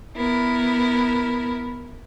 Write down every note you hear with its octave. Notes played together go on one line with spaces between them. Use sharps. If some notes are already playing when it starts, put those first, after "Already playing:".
B3 E4 A#4